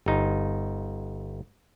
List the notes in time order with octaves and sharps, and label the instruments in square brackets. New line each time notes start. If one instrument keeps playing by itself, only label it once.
[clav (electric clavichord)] G1 D#4